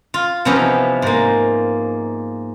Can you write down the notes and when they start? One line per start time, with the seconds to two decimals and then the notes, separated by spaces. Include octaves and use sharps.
0.14 F4
0.45 C3 E3 F3 B3 C#4 D#4
1.02 G#2 A#3